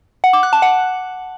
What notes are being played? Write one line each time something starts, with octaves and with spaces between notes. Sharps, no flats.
F#5
D6
F#6
A5
F#5